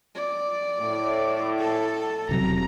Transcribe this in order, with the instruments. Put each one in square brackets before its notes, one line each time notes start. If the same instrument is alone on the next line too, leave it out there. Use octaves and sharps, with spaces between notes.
[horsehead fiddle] D5
[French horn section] A2
[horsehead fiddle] A4 A5
[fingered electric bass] E1 C3 F#3 [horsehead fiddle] A#5